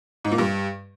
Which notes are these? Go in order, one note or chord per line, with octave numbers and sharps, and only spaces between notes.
G#2
A#2
G2